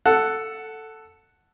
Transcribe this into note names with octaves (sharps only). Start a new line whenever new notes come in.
A4 F#5